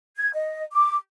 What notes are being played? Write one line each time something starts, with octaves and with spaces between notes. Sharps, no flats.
G#6
D#5
D6